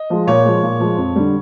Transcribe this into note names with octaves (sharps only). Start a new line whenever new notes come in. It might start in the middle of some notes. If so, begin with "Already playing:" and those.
Already playing: D#5
F3 G#3
A#2 C#5
F3 G#3
A#2
F3 G#3
F2
D3 G3